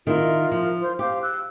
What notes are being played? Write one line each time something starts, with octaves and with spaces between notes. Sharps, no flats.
D#3 E4 F4 A#4
F3
F4 C5
G4 C5 F5 D6
E6 F#6